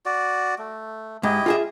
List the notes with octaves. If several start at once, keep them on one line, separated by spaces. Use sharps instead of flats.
F#4 D5
A3
G#2 E4 G4 D#5
F4 G#4 E5